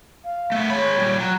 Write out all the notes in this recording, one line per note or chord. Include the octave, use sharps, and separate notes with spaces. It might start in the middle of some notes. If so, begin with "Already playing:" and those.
F5
A3 B3
G#3 C#5 B5
A#2 G3
F#3 A#5